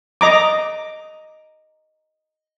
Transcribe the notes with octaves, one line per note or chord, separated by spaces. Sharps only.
D#5 A#5 D6